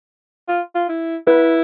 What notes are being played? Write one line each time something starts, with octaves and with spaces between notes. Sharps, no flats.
F4
F4
E4
E4 B4